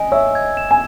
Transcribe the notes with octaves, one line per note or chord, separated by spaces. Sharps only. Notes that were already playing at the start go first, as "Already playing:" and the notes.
Already playing: D#5 G#5
C#5 E5 E6
G#6
E7
G#5